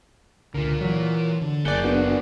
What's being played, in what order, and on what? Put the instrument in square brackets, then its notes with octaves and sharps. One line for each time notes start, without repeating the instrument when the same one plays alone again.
[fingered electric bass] C#2 D3 [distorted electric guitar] A#3 F4
[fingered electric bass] E3 [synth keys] F#3
[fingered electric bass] D3
[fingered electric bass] F#1 F#2 [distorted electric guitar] A#3 G#4 [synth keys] D5 F#5 [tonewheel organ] G6
[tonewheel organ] B3 D4 F#4